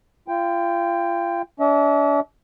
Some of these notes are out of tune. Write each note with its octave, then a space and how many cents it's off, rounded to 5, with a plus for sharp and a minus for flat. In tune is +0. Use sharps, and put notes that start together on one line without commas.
F4 -30 G5 +10
D4 -40 E5 -45